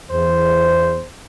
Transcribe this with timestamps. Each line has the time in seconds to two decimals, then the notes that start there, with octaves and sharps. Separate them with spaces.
0.10 E2 C5